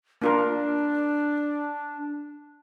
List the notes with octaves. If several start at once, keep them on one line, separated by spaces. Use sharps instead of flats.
A#3 D4 F4 A#4